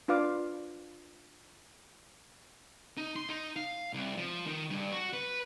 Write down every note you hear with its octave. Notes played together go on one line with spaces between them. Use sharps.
D4 F4 B4 F5 D6
D#4
C6
D#4
F5
C2
F3
D#3
G2
F#4
B4